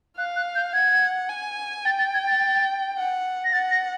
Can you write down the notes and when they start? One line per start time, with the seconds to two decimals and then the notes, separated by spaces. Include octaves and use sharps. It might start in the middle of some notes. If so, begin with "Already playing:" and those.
0.17 F5 F#6
0.36 F#6
0.55 G6
0.74 F#5 G#6
1.29 G#5
1.85 G5 A6
1.99 A6
2.14 G#6
2.27 A6
2.97 F#5
3.45 A#6
3.52 F#5 A6
3.71 A#6